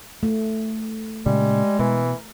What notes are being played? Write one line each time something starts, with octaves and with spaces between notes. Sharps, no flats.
A3
A#2 C#3 G3 G#3
B2 E3 A#4